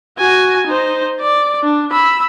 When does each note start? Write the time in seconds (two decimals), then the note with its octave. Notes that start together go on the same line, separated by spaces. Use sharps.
0.18 F#4 G#5
0.66 D#4 C5
1.21 D5
1.63 D4
1.92 B5 E6